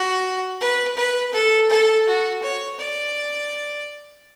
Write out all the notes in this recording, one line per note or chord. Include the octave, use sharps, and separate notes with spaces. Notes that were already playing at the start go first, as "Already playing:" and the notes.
Already playing: F#4
B4
B4
A4
A4
F#4
C#5
D5